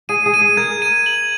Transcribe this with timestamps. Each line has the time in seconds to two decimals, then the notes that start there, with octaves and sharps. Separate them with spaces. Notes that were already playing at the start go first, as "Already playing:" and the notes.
0.09 G#4 D#7
0.26 G#4
0.34 D#7
0.41 G#4
0.57 A#4 G#6
0.82 D#7
1.06 F#7